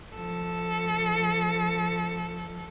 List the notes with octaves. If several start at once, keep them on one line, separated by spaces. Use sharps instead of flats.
F3 A4